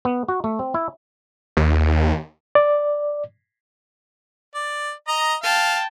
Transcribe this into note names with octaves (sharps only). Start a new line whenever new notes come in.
B3
F#4
A3
C4
E4
D#2
D5
D5
D#5 A#5
F5 G5 A5